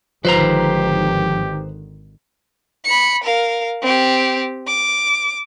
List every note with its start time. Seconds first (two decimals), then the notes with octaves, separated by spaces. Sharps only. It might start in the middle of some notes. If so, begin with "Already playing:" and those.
0.25 G#1 D3 D#3 F3 G4 B4 C5 A#5
2.85 B5 C#7
3.24 A#4 F5
3.82 C4 G4
4.67 D6